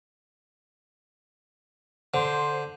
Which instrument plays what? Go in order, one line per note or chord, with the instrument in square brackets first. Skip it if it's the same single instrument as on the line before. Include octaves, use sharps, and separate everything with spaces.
[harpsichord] D3 [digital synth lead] C5